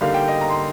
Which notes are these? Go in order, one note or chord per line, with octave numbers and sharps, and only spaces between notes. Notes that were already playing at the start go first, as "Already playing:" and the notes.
D3 G3 A#3 D#4 F5
G5
D#5
A#5
C6